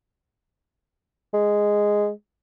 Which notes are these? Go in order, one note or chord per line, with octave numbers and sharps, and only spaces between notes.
G#3